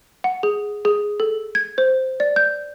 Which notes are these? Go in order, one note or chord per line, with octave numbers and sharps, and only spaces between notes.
F#5
G#4
G#4
A4
G#6
C5
D5
G6